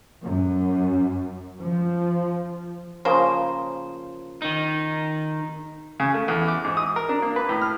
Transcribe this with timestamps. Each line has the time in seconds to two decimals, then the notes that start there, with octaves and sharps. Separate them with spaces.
0.23 F#2
1.62 F3
3.05 C#3 F3 A#3 A#4 C5
4.42 D#3 D#4
6.00 C#3
6.14 A3
6.28 E2
6.48 D6
6.64 G#2
6.77 D#6
6.96 A#4
7.09 D4
7.22 A#3
7.36 B4
7.49 A2
7.62 F6